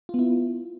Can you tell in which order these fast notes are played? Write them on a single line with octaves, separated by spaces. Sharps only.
F4 B3 E4